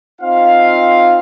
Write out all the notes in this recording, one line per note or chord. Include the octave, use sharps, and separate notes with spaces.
C4 D#4 F4 F5